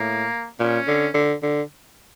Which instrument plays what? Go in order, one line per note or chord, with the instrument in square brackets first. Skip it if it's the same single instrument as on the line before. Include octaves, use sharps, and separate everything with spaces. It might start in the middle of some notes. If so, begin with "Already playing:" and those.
Already playing: [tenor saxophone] A2 [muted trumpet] A#3
[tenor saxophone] A#2 [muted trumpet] C#4
[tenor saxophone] D3
D3
D3